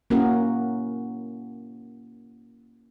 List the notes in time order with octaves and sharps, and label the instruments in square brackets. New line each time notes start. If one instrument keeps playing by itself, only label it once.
[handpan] A#3 C#4 E4 F#4 A#4